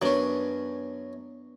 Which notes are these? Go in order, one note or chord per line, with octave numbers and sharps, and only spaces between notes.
F#2 B3 C#4 D4